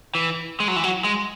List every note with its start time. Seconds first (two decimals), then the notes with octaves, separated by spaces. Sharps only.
0.15 E3
0.60 G#3
0.68 F#3
0.76 E3
0.84 F#3
1.04 G#3